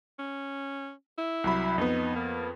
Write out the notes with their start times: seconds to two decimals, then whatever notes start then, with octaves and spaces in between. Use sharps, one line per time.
0.19 C#4
1.18 E4
1.44 C2 F#3 B5
1.78 F2 B3 D#4
2.16 A#3